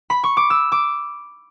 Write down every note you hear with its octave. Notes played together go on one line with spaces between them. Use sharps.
B5
C#6
D6
E6
D6